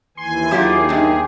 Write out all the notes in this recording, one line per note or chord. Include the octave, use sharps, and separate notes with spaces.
D#2 E3 G#5 C6
D#2 D#3 F#3 A#3 E4 F4 G4 G#4
E2 G2 D#4